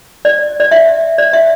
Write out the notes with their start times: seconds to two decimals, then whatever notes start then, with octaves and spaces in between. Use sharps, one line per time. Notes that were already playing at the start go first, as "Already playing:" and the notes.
0.25 D5
0.60 D5
0.71 E5
1.18 D5
1.33 E5